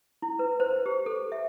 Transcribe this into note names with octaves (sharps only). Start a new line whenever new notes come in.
E4
B4
C5
G4
A4
E5